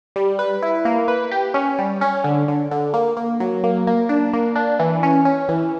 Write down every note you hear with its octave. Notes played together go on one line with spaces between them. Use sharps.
G3
B4
E4
A#3
B4
G4
C#4
G3
C#4
D3
D3
D3
A#3
A#3
F#3
A#3
A#3
D4
A#3
D4
E3
C#4
C#4
E3